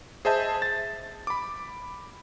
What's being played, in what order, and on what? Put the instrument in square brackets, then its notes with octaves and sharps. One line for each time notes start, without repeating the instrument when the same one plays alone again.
[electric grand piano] G#4 C5 D#5 E5 A5 G6
A6
B5 D6